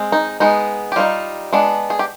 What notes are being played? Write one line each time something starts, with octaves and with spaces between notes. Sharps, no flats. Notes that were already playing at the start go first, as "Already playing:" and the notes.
Already playing: G#3 C4
D#4
G#3 B3 D#4
G4
G3 B3 D#4 F4
G#3 B3 D4
G#4
G4